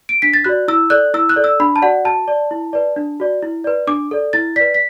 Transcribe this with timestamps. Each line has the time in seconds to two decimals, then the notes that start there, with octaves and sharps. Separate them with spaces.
0.09 D7
0.22 D4 B6
0.34 A6
0.44 F#4 D5 F#6
0.68 E4 E6
0.90 A4 D5 F#6
1.14 E4 E6
1.29 F#6
1.36 A4 D5
1.44 E6
1.60 D4 B5
1.76 A5
1.82 F#4 D5 F#5
2.04 F#4 A5
2.28 D5
2.51 E4
2.73 B4 D5
2.96 D4
3.20 F#4 D5
3.42 E4
3.64 B4 D5
3.87 D4 D6
4.11 A4 D5
4.33 E4 A6
4.56 B4 D5 B6
4.74 B6